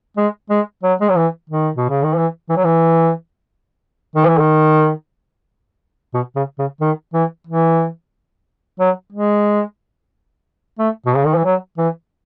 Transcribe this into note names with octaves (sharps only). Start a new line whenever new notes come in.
G#3
G#3
F#3
G#3
F#3
E3
D#3
B2
C#3
D#3
E3
E3
F#3
E3
D#3
E3
D#3
B2
C#3
C#3
D#3
E3
E3
F#3
G#3
A3
B2
C#3
D#3
E3
F#3
E3